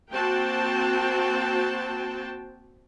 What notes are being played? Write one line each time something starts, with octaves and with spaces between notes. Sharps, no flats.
A#3 C4 F#4 C5 G5 A5